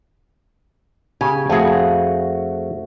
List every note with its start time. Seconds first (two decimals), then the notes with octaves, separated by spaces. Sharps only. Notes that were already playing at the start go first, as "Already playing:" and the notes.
1.21 C#3 G4 G#5
1.50 F2 A3 F#4 G#4